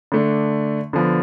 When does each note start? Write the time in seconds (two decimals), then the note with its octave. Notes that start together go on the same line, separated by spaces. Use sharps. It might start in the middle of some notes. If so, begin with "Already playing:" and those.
0.12 D3 A3 D4
0.93 D3 F3 B3